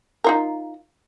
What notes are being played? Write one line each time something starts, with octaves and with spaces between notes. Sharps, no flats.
D#4 F4 A#4